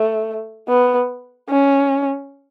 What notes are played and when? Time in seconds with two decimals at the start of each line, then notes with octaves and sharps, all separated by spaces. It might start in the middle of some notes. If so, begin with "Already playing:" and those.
Already playing: A3
0.68 B3
1.49 C#4